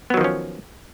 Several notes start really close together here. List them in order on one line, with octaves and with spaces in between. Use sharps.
B3 F#3 D#3 F3 C#4